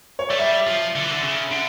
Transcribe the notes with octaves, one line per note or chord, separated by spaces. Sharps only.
C#5
A3 D5
G3 E5
F3
D3
E3
D3
C#3
D3